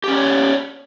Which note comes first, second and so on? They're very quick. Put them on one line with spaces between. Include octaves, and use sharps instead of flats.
G4 C#4 D5 C#5